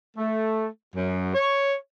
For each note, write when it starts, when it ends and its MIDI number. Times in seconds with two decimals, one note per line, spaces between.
0.17 0.67 57
0.95 1.30 42
1.34 1.75 73